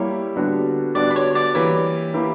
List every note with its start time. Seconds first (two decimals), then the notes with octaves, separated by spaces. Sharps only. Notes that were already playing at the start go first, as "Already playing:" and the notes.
Already playing: G3 A#3 E4 G4 C#5
0.36 D3 G3 B3 D4 F#4
0.95 D3 G3 B3 D4 F#4 D5
1.11 B4
1.16 C#5
1.35 D5
1.54 E3 A#3 E4 G4 C#5
2.14 E3 A#3 E4 G4